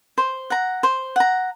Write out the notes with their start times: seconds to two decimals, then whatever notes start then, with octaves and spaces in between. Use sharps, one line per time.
0.18 C5
0.50 F#5 A#5
0.83 C5
1.16 F#5 A#5